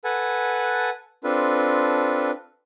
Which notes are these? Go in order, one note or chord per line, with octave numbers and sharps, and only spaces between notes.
A4 B4 F#5 G#5 A5
C4 D4 F4 A4 B4